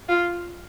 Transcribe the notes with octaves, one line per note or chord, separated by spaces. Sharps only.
F4